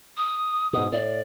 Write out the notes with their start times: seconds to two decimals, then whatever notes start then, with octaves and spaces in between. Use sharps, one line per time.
0.17 D#6
0.73 G#2 B2 D#6
0.92 A2 D5